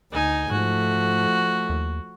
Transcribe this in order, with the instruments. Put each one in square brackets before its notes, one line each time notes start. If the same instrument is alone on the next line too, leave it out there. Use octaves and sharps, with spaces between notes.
[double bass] D2 [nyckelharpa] D#4 G#5
[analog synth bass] G#2 [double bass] F3 A3 [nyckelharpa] F#4
[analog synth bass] D#2